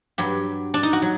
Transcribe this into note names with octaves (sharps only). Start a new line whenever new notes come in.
G2 F#3 G4
D4
D#4
F#4
F#3